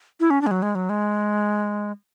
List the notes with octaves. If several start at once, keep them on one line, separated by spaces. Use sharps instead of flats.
E4
C#4
D4
G#3
F#3
G#3
F#3
G#3